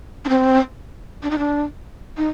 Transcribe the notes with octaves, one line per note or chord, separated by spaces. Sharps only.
D4
C4
D4
D#4
D4
D#4